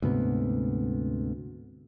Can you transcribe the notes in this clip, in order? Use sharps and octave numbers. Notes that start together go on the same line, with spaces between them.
D2 G#2 C3 B3